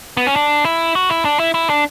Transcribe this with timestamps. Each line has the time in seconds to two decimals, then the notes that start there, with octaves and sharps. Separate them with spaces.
0.17 B3
0.27 C#4
0.36 D4
0.65 E4
0.95 F#4
1.10 E4
1.25 D4
1.39 E4
1.54 E4
1.69 D4